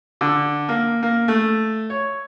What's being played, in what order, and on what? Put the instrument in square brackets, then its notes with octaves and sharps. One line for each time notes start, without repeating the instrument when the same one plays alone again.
[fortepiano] D3
A#3
A#3
A3
C#5